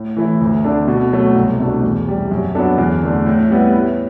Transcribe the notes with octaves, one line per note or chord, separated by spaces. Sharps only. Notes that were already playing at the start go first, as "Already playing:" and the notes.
Already playing: A2
E3 A3 E4
D2
D3 A3 D4
B2
F#3 A3
C2
B2 A3 D4
E2
C3 G3
F#2
F#3 B3 D4 A4
E2
D3 A3
A2
G3 B3 E4 B4
A2